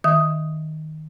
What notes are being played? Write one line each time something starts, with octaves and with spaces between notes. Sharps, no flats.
D#3 E5 D#6